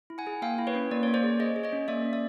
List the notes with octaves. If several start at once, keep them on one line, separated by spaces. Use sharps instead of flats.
E4
F#5 G#5
G#4
A#3 F5 G5
E4
B4 C#5
C#4
A#3 D5
A#3 C#5
C5 D5
G#4
G#4 C#5 D#5
G#4
C#5 D#5
C#4
A#3 D5 E5
C#4
D5 E5